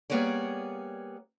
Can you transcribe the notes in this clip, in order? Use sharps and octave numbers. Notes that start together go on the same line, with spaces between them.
G3 A#3 B3 G#4 C#5 D5